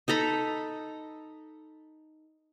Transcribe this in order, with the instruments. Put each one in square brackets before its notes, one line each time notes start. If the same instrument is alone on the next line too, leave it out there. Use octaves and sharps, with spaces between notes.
[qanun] D#4 A4 A#5 B5